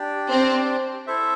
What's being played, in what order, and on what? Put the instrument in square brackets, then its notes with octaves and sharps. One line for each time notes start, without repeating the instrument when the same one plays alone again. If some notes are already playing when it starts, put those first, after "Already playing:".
Already playing: [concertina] D4 G4 D5 G5
[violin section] C4
[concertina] E4 A4 C5 E5